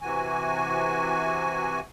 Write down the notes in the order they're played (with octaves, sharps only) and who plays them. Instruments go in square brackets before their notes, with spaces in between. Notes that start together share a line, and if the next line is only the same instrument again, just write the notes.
[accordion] C3 E3 F#4 G#5